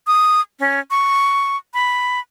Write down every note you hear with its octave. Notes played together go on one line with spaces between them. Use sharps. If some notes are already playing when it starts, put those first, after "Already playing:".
D#6
C#4
C#6
B5